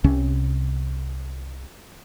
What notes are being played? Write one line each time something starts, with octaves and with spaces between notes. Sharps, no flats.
C2 C3 C#4